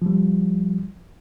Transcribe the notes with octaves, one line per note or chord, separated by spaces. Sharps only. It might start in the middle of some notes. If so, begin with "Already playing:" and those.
F3 G3